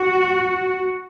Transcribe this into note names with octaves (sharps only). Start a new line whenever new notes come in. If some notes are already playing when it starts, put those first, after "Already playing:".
Already playing: F#4